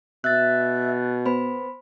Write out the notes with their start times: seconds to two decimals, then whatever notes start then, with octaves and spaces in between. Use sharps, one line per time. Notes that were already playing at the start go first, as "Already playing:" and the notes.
0.24 B2 E5 F#6 A6
1.26 B3 C5 B5